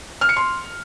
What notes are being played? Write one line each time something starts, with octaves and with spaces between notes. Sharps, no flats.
F6
C#7
C6